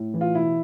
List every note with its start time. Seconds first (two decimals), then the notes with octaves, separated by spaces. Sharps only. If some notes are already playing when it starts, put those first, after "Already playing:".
Already playing: A2
0.14 E3
0.21 F4
0.34 B2 E4